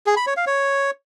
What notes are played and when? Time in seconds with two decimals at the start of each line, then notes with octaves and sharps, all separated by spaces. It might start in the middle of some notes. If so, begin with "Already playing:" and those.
0.06 G#4
0.16 B5
0.27 C#5
0.37 F5
0.47 C#5